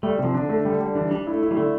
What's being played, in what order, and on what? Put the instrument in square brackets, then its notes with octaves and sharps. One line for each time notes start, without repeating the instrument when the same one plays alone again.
[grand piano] G3 [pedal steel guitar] A3
[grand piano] C3 [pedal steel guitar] F3
[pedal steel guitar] D3 [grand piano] D4
[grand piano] A3
[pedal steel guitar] D3 [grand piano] G3
[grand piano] G3
[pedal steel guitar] E3 [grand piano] D4
[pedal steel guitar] G3 [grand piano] D4
[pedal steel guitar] A3 [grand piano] E4
[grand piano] E4
[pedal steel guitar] G3
[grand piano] D3 [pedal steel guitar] A3